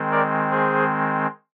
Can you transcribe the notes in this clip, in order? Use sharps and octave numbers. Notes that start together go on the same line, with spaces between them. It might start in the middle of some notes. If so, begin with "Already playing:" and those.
Already playing: D#3 G#3 C4
A#4 D5
G#4 C5